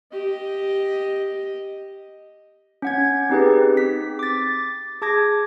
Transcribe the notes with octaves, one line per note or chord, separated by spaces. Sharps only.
G4 D#5
C#4 F#5 G#6
C4 D#4 G4 G#4 B4
C4 B6
D6 A6
G#4 A5 D6 G#6 A#6